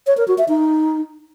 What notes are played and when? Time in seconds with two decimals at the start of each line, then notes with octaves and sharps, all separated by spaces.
0.07 C#5
0.17 A#4
0.28 F#4
0.38 E5
0.49 D#4